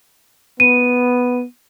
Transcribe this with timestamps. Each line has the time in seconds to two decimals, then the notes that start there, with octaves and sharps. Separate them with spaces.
0.60 B3 D#7